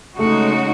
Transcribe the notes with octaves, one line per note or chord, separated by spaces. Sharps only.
C#3 G#3 A3 D#4 F#4